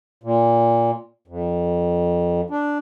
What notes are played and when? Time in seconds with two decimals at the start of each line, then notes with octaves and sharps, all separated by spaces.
0.24 A#2
1.28 F2
2.50 D4